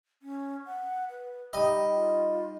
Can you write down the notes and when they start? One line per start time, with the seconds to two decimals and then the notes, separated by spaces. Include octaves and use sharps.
0.22 C#4
0.66 F#5
1.09 B4
1.53 G3 D#4 D#5 G5
1.95 F4